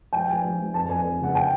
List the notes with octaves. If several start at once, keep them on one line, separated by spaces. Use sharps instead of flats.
F3 G5
F3 G#5
F3
F3
F2 A5
F2 G#5
F2
C#3 F#5
G5